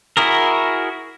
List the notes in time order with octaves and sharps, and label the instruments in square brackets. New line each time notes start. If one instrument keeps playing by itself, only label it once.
[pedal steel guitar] E4 F#4 G#4 A#4